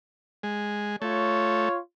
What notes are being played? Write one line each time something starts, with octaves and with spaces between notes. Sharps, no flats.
G#3
A3 F4 C#5